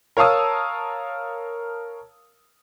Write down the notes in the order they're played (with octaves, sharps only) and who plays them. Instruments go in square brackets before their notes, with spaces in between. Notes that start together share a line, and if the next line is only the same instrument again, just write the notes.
[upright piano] A#4 C#5 F5 A5 D#6 E6